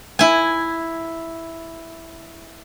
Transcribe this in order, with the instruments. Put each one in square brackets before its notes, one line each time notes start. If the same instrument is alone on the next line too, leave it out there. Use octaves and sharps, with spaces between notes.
[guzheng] E4 G#5